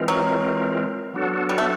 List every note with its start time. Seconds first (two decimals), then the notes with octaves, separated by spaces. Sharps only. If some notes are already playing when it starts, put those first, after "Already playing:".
Already playing: E3 G#3 C4 F4 A#4
0.08 F#3
1.14 F#3 B3 D4 F#4 A4
1.49 G3
1.58 A3